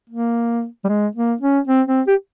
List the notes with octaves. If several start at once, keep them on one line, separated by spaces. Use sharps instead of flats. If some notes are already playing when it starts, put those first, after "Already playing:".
A#3
G3
G#3
A#3
C#4
C4
C4
G4